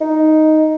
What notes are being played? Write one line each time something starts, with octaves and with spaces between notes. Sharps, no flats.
D#4